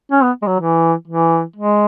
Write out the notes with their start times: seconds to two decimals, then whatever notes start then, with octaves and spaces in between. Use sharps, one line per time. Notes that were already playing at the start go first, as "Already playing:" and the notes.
0.11 C#4
0.23 B3
0.42 G#3
0.47 F#3
0.59 E3
1.07 E3
1.56 G#3